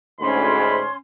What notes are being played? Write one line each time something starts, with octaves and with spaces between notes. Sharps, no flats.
D2 G#2 C#4 B5 C6